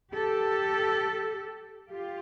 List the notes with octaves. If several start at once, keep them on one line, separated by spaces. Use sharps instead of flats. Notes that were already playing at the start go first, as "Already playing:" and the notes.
G4 A4
F4 G4